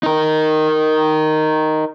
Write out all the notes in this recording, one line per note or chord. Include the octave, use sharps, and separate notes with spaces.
D#4 A#4